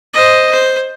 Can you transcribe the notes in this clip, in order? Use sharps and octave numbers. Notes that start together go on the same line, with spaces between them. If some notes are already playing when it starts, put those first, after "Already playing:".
C5 D#5
C5